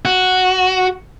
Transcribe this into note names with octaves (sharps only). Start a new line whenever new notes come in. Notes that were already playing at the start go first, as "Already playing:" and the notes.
F#4